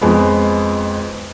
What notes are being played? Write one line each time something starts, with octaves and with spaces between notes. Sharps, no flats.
F2 G#3 B3